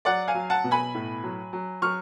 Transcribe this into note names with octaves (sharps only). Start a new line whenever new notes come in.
F#3 D5 F#5
F5 G#5
F#3
F#5 A5
B2
G#5 B5
A2
F#3
F#3
F#3 C#6 F6